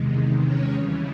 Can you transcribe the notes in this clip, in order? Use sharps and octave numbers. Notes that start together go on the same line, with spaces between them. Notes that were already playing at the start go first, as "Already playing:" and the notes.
Already playing: E2 C3 D#3 G#3
C#4 C#5
D#2 C#3 E3 G3